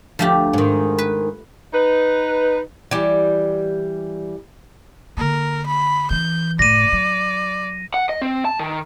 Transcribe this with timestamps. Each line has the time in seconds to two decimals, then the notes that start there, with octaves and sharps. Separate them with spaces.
0.19 D2 F3 A3 G4
0.53 G#2 D#3
0.98 B4
1.74 D#4 B4
2.91 E3 G3
5.17 D3 A#3 A#4
5.66 B5
6.10 E3 C#4 G6
6.59 F#1 A2 D5 A#6 D#7
6.92 F#3
7.94 F#5
8.09 D#5
8.22 C4
8.45 A5
8.59 D#3